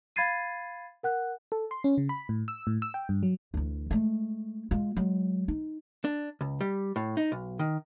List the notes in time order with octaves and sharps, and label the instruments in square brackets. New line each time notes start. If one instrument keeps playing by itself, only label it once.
[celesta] F5 B5 G#6 A6 C7 D#7
A#4 F#5 F#6
[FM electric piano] A4
C6
C#4
C#3
B5
A2
E6
A2
E6
G5
G2
F#3
[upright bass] D2 E3
G#3 A3
G#3 F4
F#3 G#3
D#4
[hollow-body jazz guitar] D4
C#2
G3
A2
D#4
B1
D#3